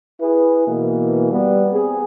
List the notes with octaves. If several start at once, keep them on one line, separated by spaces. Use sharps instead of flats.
E4 G#4 B4
B2 E3 A#3
G3 B3
C4 G#4